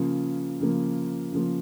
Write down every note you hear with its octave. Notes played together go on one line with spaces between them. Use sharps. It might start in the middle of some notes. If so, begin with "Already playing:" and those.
Already playing: C#3 F3 A#3
C#3 F3 A#3
C#3 F3 A#3